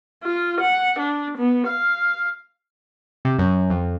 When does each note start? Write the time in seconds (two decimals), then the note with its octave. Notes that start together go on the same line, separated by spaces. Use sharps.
0.23 F4
0.61 F#5
0.99 D4
1.37 B3
1.67 F5
3.25 C3
3.39 F#2
3.70 F2